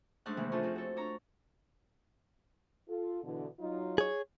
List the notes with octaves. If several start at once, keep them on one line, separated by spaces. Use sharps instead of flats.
G#2 A3 C#4 D4 F#6
G#2 C3 D#3 E3 G#3 A#3
A3 C#4 D4 F4 G#4 A4
F2 C4
F#4 A4
D4 C#5 A#5
F4 A4
B2 D3 E3
F#3 D#4 F4
G#4 C#5